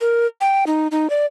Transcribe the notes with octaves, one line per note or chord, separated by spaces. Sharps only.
A#4
G5
D#4
D#4
D5